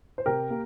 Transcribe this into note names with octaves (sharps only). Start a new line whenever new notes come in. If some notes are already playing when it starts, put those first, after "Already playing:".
C5
C3 G4 A#4
A#3